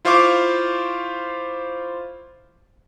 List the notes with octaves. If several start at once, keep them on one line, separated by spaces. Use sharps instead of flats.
E4 F4 C5 F5 C#6 D6